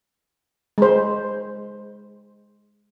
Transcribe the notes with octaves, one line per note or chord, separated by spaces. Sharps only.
G#3 C5